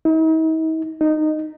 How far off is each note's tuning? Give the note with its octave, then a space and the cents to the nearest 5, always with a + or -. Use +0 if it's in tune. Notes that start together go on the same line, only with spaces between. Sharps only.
D#4 +45
D#4 -15